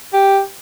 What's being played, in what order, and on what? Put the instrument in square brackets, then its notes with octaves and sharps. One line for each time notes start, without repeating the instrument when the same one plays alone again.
[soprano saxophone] G4